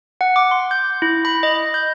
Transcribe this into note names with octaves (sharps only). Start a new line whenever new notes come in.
F#5
D6
C6
G6
E4
B5
D#5
G6